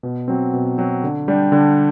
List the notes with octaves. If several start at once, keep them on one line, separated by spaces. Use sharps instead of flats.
B2
F#3 C4
B2
F#3 C4
D3
G3 D4 G4
D3